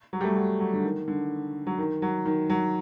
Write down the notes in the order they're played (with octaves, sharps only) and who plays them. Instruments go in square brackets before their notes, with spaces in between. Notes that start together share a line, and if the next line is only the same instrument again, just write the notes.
[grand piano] F#3
G3
A3
F#3
F#3
D3
D#3
D3
F#3
D#3
F#3
D#3
F#3